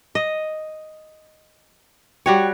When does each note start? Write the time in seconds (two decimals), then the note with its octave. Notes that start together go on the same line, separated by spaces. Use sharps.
0.15 D#5
2.26 G3 F#4 C#5 G5